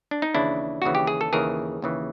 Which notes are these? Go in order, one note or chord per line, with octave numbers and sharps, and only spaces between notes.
D4
D#4
D#2 C#3 E3 D4 E4
D#2 C#3 E3 F#4
G4
G#4
A4
D#2 C#3 E3 G#4 A#4
D#2 C#3 E3